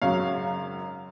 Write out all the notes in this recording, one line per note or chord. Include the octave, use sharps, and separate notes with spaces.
G#1 F#2 C#3 F#3 C#5 F5